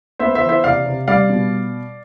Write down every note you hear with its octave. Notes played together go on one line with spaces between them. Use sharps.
B3 C5 E5
C5 E5
E3
C5 E5
C3 D5 F5
C3
G3 D5 F5
B2